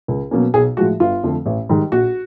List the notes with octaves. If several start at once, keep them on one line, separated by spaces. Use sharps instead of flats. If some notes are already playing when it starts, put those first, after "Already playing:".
C#2
B2 F#3 A#3 C#4
B1 G#4
A2 F3 G#3 F#4
G1 F4
F2 D3 F3 A3
A1
G#2 D#3 G3
A#1 F#4